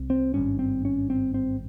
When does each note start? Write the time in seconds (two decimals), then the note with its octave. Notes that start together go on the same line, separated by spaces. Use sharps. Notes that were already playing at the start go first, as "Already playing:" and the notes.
Already playing: C2 C3
0.10 C4
0.34 G#1 G2 C#4
0.59 C4
0.85 C#4
1.10 C4
1.34 C4